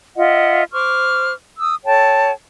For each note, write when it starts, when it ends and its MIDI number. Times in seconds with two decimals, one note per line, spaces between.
0.16 0.63 65
0.16 0.63 75
0.16 0.63 76
0.16 0.63 78
0.72 1.32 72
0.72 1.32 85
0.72 1.32 86
0.72 1.32 89
1.59 1.76 87
1.59 1.76 88
1.85 2.31 69
1.85 2.31 73
1.85 2.31 79
1.85 2.31 81